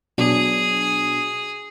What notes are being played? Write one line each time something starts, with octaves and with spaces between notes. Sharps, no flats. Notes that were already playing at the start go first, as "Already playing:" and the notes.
B2 F#3 D4 G#4